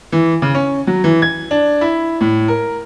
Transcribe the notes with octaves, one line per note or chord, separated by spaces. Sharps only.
E3
C#3
C#4
F#3
E3
G#6
D4
E4
A2
A#4